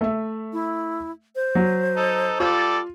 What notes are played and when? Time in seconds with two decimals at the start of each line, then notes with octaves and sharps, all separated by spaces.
0.01 A3 E5
0.53 E4
1.36 C5
1.55 F#3
1.97 D#4 A4
2.40 G3 F4 A4 D5